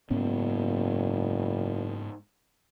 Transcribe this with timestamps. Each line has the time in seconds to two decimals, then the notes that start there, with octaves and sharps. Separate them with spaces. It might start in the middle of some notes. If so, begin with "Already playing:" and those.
0.11 F#1 G#2 B3 C#4